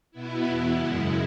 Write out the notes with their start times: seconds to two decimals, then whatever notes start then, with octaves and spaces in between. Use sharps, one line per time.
0.11 B2 B3 E4
0.44 E2 B2 B3 E4 B4
0.77 F#2 C#3 G#3 E4 F#5